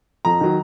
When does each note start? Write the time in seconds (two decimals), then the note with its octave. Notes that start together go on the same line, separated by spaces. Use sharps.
0.25 F2 A#5
0.41 D#3 F#3